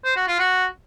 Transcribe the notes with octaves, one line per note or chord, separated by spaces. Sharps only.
C5
F#4
F4
F#4